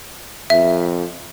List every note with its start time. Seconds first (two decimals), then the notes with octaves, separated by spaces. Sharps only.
0.50 F2 E5